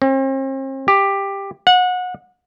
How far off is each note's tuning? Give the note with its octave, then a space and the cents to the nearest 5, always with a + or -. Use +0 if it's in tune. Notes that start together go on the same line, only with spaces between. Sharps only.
C4 +40
G4 +10
F#5 -25